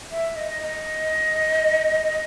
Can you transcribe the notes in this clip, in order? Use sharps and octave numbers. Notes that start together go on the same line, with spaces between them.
E5
D#5
D#5